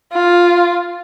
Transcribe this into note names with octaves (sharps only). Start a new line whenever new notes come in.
F4